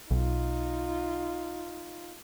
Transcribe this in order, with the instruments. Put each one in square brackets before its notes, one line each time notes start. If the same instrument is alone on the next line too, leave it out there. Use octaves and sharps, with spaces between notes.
[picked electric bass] B1 [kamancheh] D#4 F4